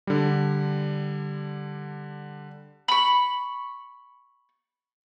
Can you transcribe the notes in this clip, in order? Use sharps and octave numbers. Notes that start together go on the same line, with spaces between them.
D3 G3
B5 C#6